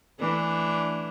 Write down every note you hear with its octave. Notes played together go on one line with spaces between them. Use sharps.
E3 A3 D4